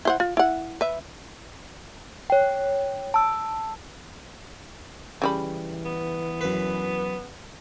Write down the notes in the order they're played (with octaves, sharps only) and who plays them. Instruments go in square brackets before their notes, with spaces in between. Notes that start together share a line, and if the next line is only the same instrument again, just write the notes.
[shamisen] E4 C5 F#5
F4
E4 F#5
B4 E5
[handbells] C#5 G5
A5 E6
[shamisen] C#3 G3 B5 [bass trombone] E3
[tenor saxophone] B3
[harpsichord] F#2 B4